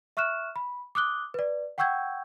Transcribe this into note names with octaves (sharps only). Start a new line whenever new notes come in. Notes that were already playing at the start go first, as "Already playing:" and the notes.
E5 C#6 F6 F#6 E7
B5
D6 D#6 F#6 G7
B4 D5
F#5 G5 C#6 E6 G6 G#6